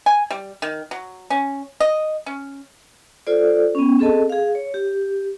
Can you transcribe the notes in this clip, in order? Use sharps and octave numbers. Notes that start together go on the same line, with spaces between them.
G#5
G3
D#3
F#3
C#4
D#5
C#4
F4 A4 C5 D5
B3 C#4
C4 G#4 A4 D#5 A5
G#4 F5
C#5
G4